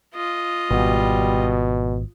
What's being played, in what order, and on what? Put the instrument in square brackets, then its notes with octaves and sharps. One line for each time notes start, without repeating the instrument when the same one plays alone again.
[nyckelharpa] F4 D#5
[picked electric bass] G#1 [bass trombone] B2 [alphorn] G3